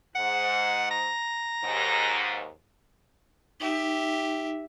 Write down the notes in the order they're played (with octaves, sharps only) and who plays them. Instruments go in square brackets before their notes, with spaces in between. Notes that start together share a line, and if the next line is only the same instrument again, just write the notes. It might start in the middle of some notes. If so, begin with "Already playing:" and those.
[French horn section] G#2 [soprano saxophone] F#5
[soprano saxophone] A#5
[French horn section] D#2 G#2
[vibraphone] D#4 [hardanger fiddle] G4 E5